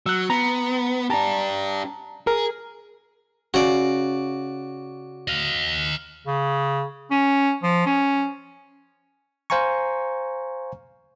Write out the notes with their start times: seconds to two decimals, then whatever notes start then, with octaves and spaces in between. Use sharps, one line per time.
0.06 F#3 E6 F#6
0.30 B3 A#5
1.10 D4 G4 A5 A#5
2.27 G#4 A#4
3.54 C#3 F#4 D5
5.28 D#5 F5
6.27 C#3
7.11 C#4
7.63 F3
7.86 C#4
9.50 C5 F5 G#5 A#5 C#6